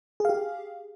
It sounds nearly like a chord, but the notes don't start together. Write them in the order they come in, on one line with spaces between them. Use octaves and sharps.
G#4 F5 G4